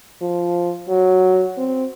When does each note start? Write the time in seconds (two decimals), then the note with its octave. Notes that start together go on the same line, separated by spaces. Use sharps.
0.21 F3
0.89 F#3
1.58 C4